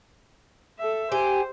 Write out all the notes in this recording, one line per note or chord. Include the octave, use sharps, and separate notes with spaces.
A4 E5
G4 C5 G#5